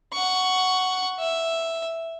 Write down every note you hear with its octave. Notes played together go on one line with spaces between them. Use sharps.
F#5 C#6
E5